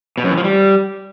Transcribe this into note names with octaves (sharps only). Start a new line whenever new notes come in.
B2
F#2
E3
F3
G3